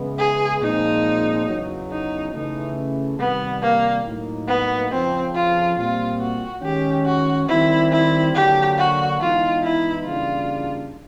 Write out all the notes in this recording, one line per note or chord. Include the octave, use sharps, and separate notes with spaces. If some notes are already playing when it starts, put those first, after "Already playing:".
Already playing: C#3 E3 G#3 B3
G#4
A#2 F3 G#3 C4 D#4
E2 C#3 F#3
D#4
C#3 E3 A3 D#4
C3 D#3 G3 B3
A#3
A2 F#3 A#3 D#4
B3
F2 C#3 F3 C4
F4
A#2 G3 C4 F4
F#4
D#3 G#3 C#4 G4
F#4
D#3 G3 C4 E4
E4
D3 F#3 A#3 D4 G4
F#4
E3 G#3 B3 D#4 F4
E4
C#3 E3 G3 A#3 D4 F4